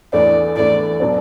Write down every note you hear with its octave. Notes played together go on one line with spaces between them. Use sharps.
E2 E3 A3 D4 D5
E2 E3 A3 D4 D5
B2 F#3 D4